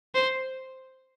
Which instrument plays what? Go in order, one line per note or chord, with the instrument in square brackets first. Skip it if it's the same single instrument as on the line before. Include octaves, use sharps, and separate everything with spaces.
[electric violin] C5